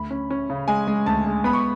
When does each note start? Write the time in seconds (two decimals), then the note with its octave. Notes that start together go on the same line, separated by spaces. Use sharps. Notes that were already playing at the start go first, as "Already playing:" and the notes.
Already playing: D2 B5
0.10 C#4
0.30 C#4
0.50 C#3
0.68 G#3 G#5
0.88 G#3
1.06 D2 A5
1.26 G#3
1.44 B3 B5
1.53 C#6